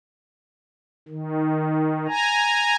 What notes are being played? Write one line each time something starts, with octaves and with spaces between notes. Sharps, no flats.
D#3
G#5 A#5